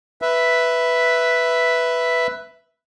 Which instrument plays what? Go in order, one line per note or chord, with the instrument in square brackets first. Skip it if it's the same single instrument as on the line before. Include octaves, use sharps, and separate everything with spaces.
[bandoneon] B4 E5